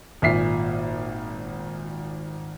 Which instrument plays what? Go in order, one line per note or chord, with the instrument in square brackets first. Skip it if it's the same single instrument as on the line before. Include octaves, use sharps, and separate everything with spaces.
[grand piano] G#1 A#2 E5 B6 C7